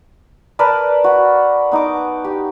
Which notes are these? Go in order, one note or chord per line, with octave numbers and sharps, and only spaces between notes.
A#4 B4 D5 A5
F#4
B3 D#4 D#5 D6
G4